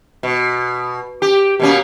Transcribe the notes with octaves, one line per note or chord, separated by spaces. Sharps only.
B2
G4
B2 A#3 C#4